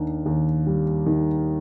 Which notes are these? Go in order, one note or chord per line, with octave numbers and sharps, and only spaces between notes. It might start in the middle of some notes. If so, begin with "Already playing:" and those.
Already playing: D#2 D#3 D4
D#2
G3
D#3